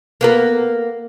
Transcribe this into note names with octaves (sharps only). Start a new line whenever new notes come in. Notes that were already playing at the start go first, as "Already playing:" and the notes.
A#3 B3 A#4